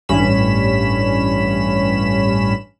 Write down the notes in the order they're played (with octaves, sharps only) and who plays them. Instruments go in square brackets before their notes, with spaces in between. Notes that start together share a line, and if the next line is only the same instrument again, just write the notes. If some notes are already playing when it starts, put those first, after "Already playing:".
[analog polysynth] A1 G2 C#4 B5 E7